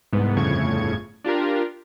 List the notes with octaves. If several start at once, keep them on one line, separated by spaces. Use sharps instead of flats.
C2 G#2 B3
G1 F2 A2 C#3 C#6 G#6
D4 F4 G4 A#4